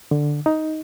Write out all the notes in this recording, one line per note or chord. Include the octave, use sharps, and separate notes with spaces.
D3
D#4